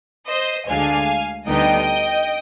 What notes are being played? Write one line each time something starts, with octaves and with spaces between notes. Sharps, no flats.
C5 D#5
D2 D3 G#3 D4 F5 G#5
D2 D3 G3 B3 D#4 D#5 G5